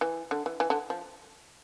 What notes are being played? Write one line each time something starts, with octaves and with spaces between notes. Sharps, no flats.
E3
D3
E3
E3
D3
F3